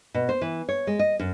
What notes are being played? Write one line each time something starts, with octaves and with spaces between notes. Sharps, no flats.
B2
C5
E3
C#5
G#3
D#5
F#2